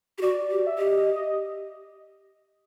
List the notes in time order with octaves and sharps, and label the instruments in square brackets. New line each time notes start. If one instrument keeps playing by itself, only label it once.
[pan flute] G4
[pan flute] F#4 [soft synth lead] D5
[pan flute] G4
[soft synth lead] E5
[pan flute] G4 [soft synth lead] D#5
[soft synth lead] D#5
D#5